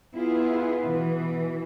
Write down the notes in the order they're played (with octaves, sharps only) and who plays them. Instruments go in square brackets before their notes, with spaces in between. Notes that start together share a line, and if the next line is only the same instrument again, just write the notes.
[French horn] B3 [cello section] E4 F4 G#4
[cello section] B2 E3